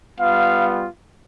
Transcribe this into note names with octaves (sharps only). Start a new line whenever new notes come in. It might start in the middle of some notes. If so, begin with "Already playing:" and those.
G3 B3 F4 F5